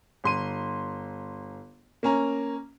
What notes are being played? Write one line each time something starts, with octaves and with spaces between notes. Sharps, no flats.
G1 C6 D#7
A#3 C#4 A#5